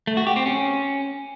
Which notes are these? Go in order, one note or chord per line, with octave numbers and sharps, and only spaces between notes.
A3
F#4
G4
C4
C#4